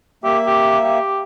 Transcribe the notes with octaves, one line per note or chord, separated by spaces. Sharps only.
A#3 G4 E5
G4
G4